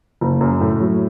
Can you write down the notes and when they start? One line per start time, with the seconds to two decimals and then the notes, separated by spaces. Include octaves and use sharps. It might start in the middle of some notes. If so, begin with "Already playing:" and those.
0.21 F#1
0.41 F#2
0.60 A2
0.80 F#3